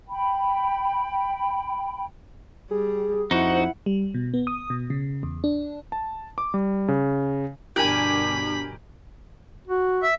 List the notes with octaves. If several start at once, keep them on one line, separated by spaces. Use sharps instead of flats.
G5 B5
G3 G#4
F2 D#4 E4 F#4 C5 F#5
G3
B2
B3
D#6
B2
C#3
E2
D4
A5
D6
G3
C#3
G1 B2 D4 G4 A#4 G#5 B5
F#4
E5